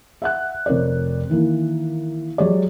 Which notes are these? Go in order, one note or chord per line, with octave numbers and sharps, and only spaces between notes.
E5 F#5 F#6
F1 F2 A#4 C#5 D5
D#3 E3 A#3 E4
F#3 G#3 G4 C#5 D5